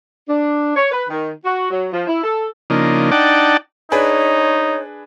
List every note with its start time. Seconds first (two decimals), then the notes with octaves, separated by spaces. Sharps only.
0.28 D4
0.76 C#5
0.91 B4
1.09 D#3
1.44 F#4
1.71 F#3
1.93 F3
2.07 E4
2.23 A4
2.70 C#3 F3 A#3 D4 D#4
3.11 D4 D#4 D5 F#5 G5 A5
3.92 D4 D#4 G#4 B4 C#5